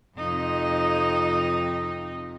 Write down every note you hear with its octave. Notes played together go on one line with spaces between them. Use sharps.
F2 C3 D#4